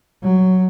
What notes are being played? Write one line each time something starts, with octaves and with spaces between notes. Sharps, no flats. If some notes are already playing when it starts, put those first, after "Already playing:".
F#3